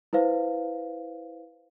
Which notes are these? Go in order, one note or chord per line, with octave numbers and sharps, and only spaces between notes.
E4 B4 C5 F5